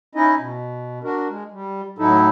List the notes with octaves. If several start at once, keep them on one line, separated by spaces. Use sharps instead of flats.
C#4 D#4 E4 D#5
B2
D4 F#4 A#4
G#3
G3
A2 F#3 D#4 E4 A4